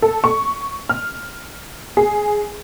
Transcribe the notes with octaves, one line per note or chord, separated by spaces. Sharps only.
A4
C#6
F6
G#4